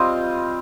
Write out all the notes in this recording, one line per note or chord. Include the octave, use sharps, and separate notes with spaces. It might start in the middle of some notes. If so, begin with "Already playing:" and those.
Already playing: G3 C4 F4 D#5